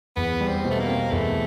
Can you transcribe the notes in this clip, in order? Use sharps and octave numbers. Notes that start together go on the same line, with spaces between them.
E2 B3
G3
C4
B2
A3
A#3
C4
E2 A3